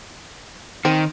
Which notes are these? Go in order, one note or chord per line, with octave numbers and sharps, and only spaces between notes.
D#3 C4